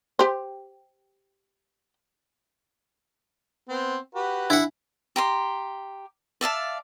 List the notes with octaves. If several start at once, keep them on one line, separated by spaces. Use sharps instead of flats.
G4 C5
B3 C4
F#4 G4 B4
D4 E4 F#5
G4 A#5 C6
D5 E5 F5 A5